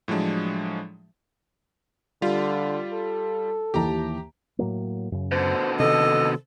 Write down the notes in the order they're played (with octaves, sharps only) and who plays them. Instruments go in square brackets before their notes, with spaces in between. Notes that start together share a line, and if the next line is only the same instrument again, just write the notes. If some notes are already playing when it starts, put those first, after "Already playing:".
[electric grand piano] A2 F3 F#3 G#3 D4
[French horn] D3 [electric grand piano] G3 F4
[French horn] A4
[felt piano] D#2 E3 A5 [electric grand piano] G4 A#5
[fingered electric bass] A2 F#3 A#3
F#2 C#3
[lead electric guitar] B2 D3 [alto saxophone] C5
[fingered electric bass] C3 D#3 [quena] A4 [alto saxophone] D#5